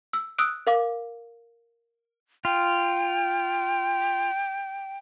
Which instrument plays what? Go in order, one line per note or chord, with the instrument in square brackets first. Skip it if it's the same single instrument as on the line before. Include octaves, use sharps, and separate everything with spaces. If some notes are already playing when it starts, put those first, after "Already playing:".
[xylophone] E6
D#6 E6 F#6 D7
A#4 F5 D6
[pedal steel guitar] F4 [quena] G5